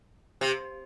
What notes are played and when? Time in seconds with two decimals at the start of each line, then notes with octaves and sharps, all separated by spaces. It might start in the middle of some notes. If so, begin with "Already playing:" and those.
0.41 C3